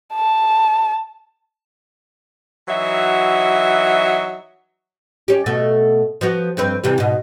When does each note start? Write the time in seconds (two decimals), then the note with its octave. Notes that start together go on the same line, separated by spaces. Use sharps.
0.15 A5
2.68 E3 F#3 D#4 F#4 E5
5.28 C#4 G4
5.46 B2 A3
6.21 F3 B3 F#4
6.57 G2 C4 B4
6.84 C3 E3 G3
6.98 G#2 B2